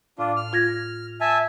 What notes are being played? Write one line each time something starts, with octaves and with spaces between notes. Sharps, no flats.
A2 D4 F4
F6
F4 G#6 A#6
E5 G#5 A5